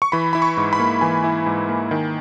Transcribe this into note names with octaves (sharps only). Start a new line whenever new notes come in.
C#6
E3 B5
E4 B5
C#6
G#2
B5
A#3
E3 G#5
E4
G#2
A#3
D#3